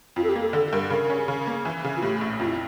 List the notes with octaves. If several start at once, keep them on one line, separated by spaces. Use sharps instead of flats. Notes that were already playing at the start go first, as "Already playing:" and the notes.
F2 F4
A4
G4
A#3
A4
D3 A4
G2 A#4
C#3 A#4
C#4
C#3
A#3
E3
C#3
F4
A2 G4
A#1
F2 F4
E4